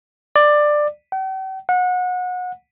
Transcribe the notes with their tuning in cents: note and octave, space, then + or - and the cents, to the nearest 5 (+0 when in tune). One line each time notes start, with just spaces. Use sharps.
D5 +15
G5 -45
F#5 -30